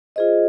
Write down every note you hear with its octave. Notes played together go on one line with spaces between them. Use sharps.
F4 G#4 C5 D#5